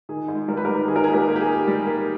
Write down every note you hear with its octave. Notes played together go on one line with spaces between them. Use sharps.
D#3 G#4
G#2
G3 A#4
B4
G3 G4 A#4
D#3 G#4
A#4
G#4
A#3
G4 A#4
A#3
G4
G#4
A#3
G3
A#3